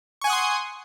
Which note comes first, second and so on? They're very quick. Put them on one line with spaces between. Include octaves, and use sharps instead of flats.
C#6 G#5 F#5 D#6 C6